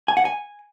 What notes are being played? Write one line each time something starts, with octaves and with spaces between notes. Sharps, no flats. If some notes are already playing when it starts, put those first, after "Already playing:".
G#5
F#5
G#5